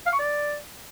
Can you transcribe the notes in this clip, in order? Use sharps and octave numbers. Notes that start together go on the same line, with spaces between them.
F5
C#6
D5